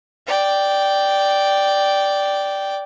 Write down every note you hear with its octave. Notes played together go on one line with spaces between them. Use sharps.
D5 G5